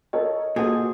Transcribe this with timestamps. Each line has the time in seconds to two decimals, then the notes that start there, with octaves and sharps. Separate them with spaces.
0.13 A4 A#4 C#5 D#5
0.56 A#2 F#4 G#4 A4 C5